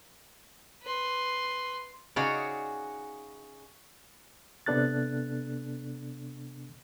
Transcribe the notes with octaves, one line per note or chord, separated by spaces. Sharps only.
B4 C6
C#3 D#4 F#4 G#4 C#5 D5
C3 B3 D4 A4 F#6 A6